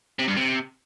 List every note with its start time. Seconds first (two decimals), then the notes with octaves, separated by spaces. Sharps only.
0.19 C3
0.28 G2
0.36 C3